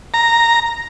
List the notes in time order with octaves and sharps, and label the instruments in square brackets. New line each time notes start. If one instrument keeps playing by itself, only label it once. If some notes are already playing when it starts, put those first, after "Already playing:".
[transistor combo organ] A#5